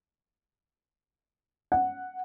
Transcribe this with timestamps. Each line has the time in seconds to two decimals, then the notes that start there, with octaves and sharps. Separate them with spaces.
1.72 F#5